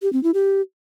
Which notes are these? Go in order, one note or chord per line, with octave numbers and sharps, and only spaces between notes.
G4
C4
E4
G4